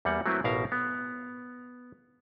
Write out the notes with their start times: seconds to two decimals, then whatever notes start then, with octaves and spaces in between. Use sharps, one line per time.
0.05 E2 G3 A#3 F#5
0.26 F#3 A3 A#3 C4 E4 B4
0.44 A1 B2 A#4 E5 F5 A#5
0.72 B3